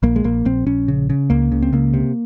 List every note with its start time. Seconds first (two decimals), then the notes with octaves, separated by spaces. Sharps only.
0.03 A#1 A#3
0.16 G#3
0.24 A#1 A#3
0.45 A#1 C4
0.66 A#1 C#4
0.88 C#3
1.10 C#3
1.30 C#2 A#3
1.52 C#3
1.62 C4
1.73 C#2 A#3
1.94 C3